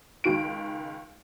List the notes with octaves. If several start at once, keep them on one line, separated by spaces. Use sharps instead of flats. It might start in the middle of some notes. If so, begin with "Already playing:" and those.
C#2 D#3 D7